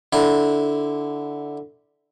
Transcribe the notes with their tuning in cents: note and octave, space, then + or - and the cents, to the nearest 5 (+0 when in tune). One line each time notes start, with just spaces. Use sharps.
D3 +0 E4 -15